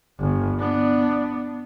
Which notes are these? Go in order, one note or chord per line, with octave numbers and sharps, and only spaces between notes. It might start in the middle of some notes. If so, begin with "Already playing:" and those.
G1
B3 D4